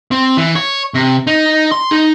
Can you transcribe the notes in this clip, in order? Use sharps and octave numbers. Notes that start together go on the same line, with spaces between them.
C4
E3
C#5
C3
D#4
C6
D#4